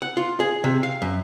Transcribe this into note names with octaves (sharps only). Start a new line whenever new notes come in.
F#5
F4
G#4
C3
F5
F#2